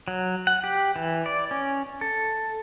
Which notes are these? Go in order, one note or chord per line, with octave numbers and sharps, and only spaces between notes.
F#3
F#5
G4
E3
D5
C#4
A4